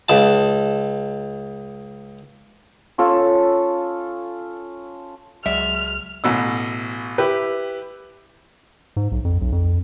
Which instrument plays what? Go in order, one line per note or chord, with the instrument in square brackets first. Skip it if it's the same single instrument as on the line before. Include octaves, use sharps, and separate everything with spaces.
[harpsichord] C#2 A5
[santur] C#4 F4 A4
[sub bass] C#2 [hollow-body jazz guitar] F#3 G#3 D5 [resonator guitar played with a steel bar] E5 [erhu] F6
[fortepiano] A1 B2 E6
E4 G4 B4
[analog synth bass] G#2
B1
F2
B1
F2